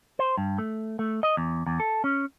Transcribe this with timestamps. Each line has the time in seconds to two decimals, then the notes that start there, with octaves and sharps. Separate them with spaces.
0.19 C5
0.38 G2
0.58 A3
0.99 A3
1.23 D#5
1.37 E2
1.67 E2
1.80 A4
2.04 C#4